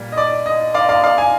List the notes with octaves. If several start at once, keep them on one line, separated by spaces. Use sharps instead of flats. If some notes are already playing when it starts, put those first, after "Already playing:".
Already playing: A#2 G3 A#3
D#5
D5
D#5
D5 F5
D5 F5
D5 F5
F5 G#5